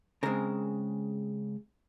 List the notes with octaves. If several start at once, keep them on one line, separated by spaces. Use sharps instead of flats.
C#3 G#3 C4 A#4